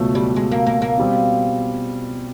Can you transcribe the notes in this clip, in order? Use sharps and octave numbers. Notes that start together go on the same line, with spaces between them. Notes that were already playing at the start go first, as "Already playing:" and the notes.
Already playing: C#2 B2 F#3 A3
G3
G#3
A#3
A#3
A#3
B2 G3 C4